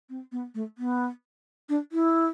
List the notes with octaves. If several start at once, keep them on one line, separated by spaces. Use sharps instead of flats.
C4
B3
A3
B3
D4
E4